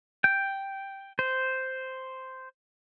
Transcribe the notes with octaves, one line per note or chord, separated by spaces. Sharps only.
G5
C5